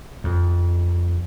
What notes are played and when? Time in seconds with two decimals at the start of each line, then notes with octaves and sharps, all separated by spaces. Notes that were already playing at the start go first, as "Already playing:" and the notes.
0.24 F2